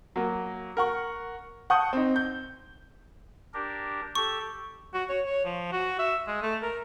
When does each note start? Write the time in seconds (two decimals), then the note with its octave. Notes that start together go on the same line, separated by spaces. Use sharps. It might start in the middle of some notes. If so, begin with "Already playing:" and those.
0.16 F#3 A#3
0.77 A#4 F#5 C#6
1.70 F#5 A5 C#6 D#6 G6
1.93 C4 D#4
2.16 G6
3.54 D4 G4 A#4
4.15 G4 A4 C#6
4.94 F#4
5.09 C#5
5.26 C#5
5.45 F3
5.72 F#4
5.99 E5
6.27 G#3
6.42 A3
6.62 A#4